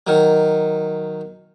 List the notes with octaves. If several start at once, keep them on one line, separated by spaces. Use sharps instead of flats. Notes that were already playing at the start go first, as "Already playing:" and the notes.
D#3 F#3